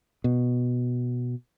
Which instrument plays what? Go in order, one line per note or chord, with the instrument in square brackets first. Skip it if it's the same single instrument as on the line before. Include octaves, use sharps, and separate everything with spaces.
[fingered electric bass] B2